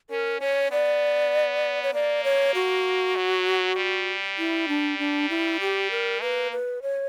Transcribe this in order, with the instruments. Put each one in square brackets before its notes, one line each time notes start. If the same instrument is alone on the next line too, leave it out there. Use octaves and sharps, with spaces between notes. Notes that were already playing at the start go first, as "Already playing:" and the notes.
[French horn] C#4 [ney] A#4
[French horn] C#4 [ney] C#5
[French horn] B3 [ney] D5
[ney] C#5
[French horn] A#3 [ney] D5
[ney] C#5
F#4
[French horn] F#3
G3
[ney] E4
D4
D4
E4
G4
A#4
[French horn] A#3 [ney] B4
[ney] B4
C#5